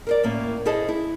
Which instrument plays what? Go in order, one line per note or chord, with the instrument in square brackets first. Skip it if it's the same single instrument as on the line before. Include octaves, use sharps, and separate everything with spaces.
[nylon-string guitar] A#4 C5 D5
A2 A#3 C#4
C#4 E4 G#4 A4 C5 D#5
E4